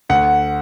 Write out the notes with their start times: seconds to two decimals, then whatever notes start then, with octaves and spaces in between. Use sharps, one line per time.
0.09 D2 F#5